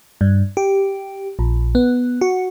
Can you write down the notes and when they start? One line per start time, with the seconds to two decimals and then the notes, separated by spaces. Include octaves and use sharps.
0.21 G2
0.57 G4
1.39 A#1
1.75 B3
2.21 F#4